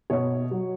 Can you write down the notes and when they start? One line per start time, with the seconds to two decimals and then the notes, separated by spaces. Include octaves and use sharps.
0.10 B2 C#5
0.51 F#3